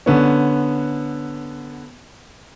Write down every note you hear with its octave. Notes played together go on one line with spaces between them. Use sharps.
D3 B3 C#4